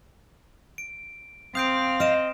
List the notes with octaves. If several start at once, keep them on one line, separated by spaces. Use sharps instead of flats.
D7
C4 F5 D#6 G6 D7
D#5 F6 D7 E7